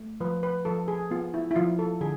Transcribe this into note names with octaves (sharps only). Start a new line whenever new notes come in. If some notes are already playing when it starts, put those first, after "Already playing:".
Already playing: A3
F3 B4
B4
F3 A4
G#4
B3 F4
E4
E4
F3 F4
A4
D3 G#4